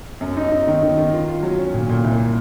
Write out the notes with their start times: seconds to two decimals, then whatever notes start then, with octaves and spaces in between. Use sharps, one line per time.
0.21 F#2
0.37 D#4
0.52 D#4
0.67 D#3
0.82 D#3
0.97 D#3
1.13 F4
1.28 F4
1.43 F#3
1.58 C#4
1.74 A#2
1.89 A#2
2.04 C2